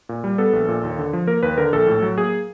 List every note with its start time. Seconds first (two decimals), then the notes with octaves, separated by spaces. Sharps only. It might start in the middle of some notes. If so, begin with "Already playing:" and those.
0.09 A#2
0.24 G3
0.38 B3 A4
0.53 A#1
0.68 A#2
0.84 D#2
0.99 D3
1.13 F3
1.27 A#3 A#4
1.43 D#2 B4
1.58 D3 A#4
1.72 A#1 A4
1.87 A2
2.02 F#3
2.18 A#3 G#4